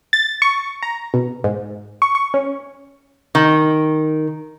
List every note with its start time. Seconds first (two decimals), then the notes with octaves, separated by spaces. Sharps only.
0.13 A6
0.42 C#6
0.83 A#5
1.14 B2
1.44 G#2
2.02 C#6
2.15 C#6
2.34 C#4
3.35 D#3